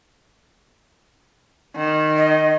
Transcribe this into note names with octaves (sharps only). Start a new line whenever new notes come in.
D#3
D#5